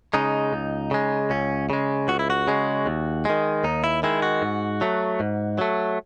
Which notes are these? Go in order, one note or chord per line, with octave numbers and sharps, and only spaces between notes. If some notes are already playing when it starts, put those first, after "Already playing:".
C#3 G#3 D#4
C#2
C#3 G#3
C#2 C#4
C#3 G#3
C#2 F#4
E4
F#4
C#3 G#3
D#2
D#3 G#3
D#2 D#4
E4
D#3 G#3 E4
F#4
G#2
F#3 A3
G#2
F#3 A3